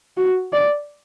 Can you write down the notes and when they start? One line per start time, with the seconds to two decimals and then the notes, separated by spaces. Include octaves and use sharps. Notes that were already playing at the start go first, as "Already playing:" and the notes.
0.17 F#4
0.53 D5